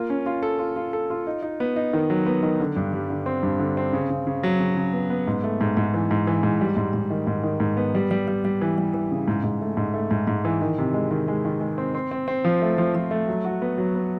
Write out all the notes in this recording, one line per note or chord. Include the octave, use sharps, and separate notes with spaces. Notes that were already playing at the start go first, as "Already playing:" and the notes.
Already playing: A#3 F4
C#4
F4
A4
F4
F4
A4
F4
D#4
D#4
B3
D#4
D#3
F#3
B3
D#3
D3
G2
G3
D3
C4
G2
D3
C4
C#3
C#3
C#3
F#3
C#3
C#3
B3
B3
G#2
A3
G#2
G#2
E3
G#2
E3
G#2
G3
G#2
G#2
D#3
G#2
D#3
G#2
B3
G3
G3
G3
G3
E3
G3
E3
C#3
G#2
G#2
A3
G#2
A3
G#2
G#2
E3
D#3
C3
G#3
D#3
G#3
D#3
G#3
C4
C4
C4
C4
F3
A3
F3
F3
A3
F#3
F#4
B3
F#3
B3